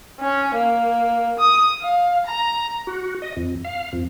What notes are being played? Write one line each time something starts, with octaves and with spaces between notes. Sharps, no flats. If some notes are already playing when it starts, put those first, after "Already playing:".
C#4
A#3
D#6
F5
A#5
F#4
D#5
F2
F5
F2